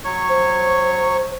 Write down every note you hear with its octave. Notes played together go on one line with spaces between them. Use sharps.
F#3 C#5 C#6
C5